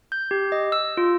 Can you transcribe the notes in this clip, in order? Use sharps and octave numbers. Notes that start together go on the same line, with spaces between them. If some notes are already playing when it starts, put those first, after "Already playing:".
G6
G4
D#5
E6
F4